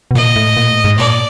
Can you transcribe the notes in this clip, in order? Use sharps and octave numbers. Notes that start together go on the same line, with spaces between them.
B2
A#2 D#5
A2
A#2
A2
G#2
A#2 D5